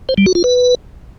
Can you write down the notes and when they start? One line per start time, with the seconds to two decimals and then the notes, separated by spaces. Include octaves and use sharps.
0.09 C5
0.18 G3
0.26 F#4
0.35 F4
0.44 B4